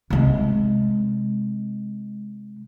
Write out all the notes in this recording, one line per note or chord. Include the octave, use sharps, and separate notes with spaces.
C3 G#3